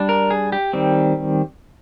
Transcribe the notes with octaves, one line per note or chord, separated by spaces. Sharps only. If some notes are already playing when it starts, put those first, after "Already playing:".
Already playing: G3 D4
A#4
G#4
G4
D#3 G3 C4